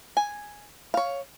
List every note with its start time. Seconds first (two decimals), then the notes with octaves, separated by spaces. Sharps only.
0.17 G#5
0.94 C#5 F5